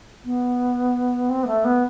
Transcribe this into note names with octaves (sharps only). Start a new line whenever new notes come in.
B3
C4
B3
A3
B3